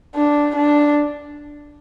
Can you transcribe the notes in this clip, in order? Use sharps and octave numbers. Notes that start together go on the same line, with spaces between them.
D4
D4